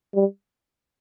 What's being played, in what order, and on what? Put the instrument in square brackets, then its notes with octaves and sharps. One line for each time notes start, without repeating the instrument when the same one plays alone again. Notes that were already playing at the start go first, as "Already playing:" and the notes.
[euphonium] G3